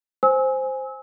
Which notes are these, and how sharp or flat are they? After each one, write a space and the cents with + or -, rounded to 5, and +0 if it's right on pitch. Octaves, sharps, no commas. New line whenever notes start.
C5 +0 G#5 +0 E6 -30